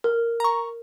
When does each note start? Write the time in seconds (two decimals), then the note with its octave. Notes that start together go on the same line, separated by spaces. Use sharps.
0.04 A#4
0.40 A#5 C#6